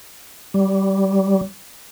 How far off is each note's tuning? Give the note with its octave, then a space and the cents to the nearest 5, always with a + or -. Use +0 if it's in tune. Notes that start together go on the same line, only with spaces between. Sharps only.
G3 -20